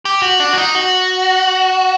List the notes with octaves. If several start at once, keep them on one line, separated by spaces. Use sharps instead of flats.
G4
F#4
D4
F#4
D#4
F#4